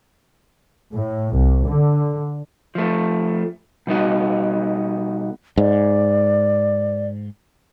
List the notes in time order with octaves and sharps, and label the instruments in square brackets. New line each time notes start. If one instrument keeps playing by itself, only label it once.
[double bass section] A2
C2
D3
[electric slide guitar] F3 A3
B2 G3 D#4 F#4
[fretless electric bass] G#2 [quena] D5